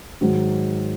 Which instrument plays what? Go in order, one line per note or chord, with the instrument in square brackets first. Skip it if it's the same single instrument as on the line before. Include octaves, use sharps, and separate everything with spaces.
[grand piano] G#2 D#3 F#3